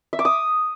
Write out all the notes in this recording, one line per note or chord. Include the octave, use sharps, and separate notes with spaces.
E5
D6
D#6